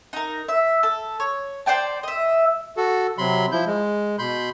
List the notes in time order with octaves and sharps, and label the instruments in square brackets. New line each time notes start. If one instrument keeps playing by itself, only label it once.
[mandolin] D#4 A#4
E5
A4
C#5
C5 D5 G5 A5
D#5 E5
[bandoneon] F#4 A4
C3 F#3 B5 C6
F3 E4 G6
G#3
B2 B5 C6 G6